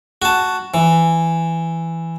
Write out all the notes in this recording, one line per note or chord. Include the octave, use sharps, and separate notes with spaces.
F#4 A5
E3